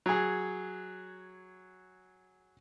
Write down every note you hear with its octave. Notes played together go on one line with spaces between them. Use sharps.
F#3 G#4